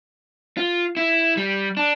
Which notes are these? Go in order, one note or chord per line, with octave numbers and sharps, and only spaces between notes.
F4
E4
G3
D4